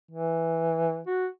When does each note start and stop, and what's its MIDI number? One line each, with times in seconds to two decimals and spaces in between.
0.11 1.00 52
1.07 1.26 66